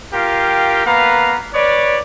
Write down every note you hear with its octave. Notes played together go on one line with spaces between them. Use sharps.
F4 G4 A#4 F5 G5
A#3 B3 B4 F5 A#5
B4 C#5 D5